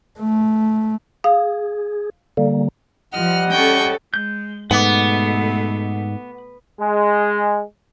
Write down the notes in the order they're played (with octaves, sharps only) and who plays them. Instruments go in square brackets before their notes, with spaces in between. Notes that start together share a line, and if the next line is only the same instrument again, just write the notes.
[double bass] A3
[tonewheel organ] G#4 [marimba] F5
[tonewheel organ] D3 G3 A#3
[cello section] F3 [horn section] G3 D#5 F#5 [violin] F6
[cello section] C#4 A4 [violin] G5 C#6
[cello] G#3 [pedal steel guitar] G6
[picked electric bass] G#2 [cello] B2 A3 [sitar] B3 [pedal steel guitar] F#5 D6
[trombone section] G#3